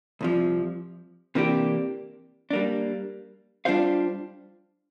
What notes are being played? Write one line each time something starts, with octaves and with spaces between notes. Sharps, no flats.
C2 C3 F3
C3 E3 A#3 D4 G4
G3 A#3 D4
G3 D4 F4 C5 F5